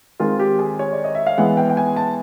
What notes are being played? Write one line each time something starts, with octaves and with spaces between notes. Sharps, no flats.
D#3 G#3 C4 F4
G4
G#4
C#5
D5
D#5
E5
F5
E3 G#3 B3 F#5
G5
G5
G#5
A5